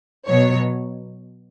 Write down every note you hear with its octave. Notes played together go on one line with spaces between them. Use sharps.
B2 F#3 C#5